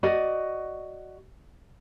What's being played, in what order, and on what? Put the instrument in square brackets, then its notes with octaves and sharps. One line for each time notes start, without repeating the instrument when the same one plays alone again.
[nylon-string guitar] F#4 D5 D#5